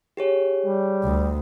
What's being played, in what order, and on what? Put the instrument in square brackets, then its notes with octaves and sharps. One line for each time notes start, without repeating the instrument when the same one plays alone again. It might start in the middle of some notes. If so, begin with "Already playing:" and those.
[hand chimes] G4 G#4 C#5
[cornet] G3
[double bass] D2